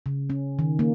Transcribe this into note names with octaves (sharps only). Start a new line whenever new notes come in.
C#3
C#4
D#3
A#3